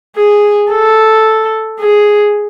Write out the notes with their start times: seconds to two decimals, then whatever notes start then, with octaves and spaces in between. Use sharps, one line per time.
0.16 G#4
0.71 A4
1.81 G#4